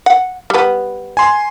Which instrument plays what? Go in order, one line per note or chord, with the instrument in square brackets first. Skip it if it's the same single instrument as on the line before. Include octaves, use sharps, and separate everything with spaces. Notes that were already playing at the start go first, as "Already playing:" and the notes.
[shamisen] F#5
G3 B3
[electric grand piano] G#5 C6